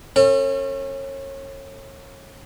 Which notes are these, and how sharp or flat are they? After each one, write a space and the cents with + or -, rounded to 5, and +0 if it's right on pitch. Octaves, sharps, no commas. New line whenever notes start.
C#4 -30 A4 +45